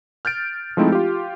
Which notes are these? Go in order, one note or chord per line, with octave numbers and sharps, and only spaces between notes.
F6 G6 A6 D7
F3 G#3 A3 C4 D#4 E4
F4 G4